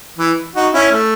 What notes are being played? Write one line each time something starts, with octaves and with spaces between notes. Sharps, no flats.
E3
D#4 F#4
C#4 E4
A3